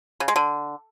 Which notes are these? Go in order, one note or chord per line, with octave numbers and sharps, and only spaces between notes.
C#3
G#3
D3